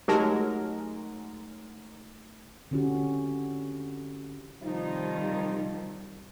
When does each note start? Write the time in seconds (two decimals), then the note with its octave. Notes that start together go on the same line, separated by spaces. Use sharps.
0.08 F#3 G#3 A3 D#4 G4 A#4 A5
2.71 D3 C4 C#4 E4 F#4 G4
4.61 C3 D#3 F3 G3 D#4